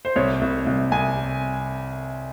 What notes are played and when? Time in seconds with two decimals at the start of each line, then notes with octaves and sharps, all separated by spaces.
0.05 C5
0.16 C2 C#5
0.41 C2
0.67 C2
0.92 C2 G#5